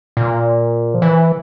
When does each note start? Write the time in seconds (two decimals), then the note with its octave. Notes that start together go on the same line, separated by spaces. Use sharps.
0.17 A#2
0.94 F3
1.02 E3